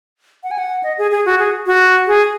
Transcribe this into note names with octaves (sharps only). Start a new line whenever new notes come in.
F#5
G#5
F#5
D#5
G#4
G#4
F#4
G#4
F#4
G#4